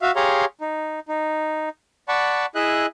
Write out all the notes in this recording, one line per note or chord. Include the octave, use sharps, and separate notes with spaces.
F#4 E5 F5
G4 G#4 C#5 F5 A#5 C6
D#4
D#4
D5 F#5 A5 B5 C#6
E4 G#4 D#5 E5 F#6